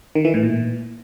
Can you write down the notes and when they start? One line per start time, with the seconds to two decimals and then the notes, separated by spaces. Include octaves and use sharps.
0.15 D#3
0.25 E3
0.34 A2
0.43 A#2